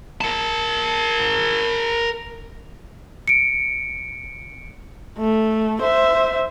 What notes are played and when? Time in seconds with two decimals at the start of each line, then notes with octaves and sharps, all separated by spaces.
0.21 A#4 A5
3.28 C#7 D7
5.18 A3
5.82 C5 E5